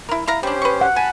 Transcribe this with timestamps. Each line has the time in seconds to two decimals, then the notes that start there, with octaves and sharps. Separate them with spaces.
0.09 E4 A#4
0.27 E4 F5 A#5
0.43 G3 C#4 D4 G4 C5
0.62 B4 C#6
0.81 F#5
0.96 G#5 A5 B5